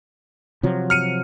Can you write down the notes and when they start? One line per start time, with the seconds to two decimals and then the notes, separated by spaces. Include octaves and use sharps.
0.63 C3 F3 F#3
0.90 F6 C#7 D#7